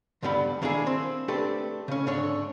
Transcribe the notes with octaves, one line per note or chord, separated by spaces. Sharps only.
C#2 G2 D3 G3 B3 B5
D#3 A#3 D4 E4 G#4 A4
C4
A3 C4 D4 G4 A4 B4
C#3 C#4
G#2 D3 D4 C#5 E5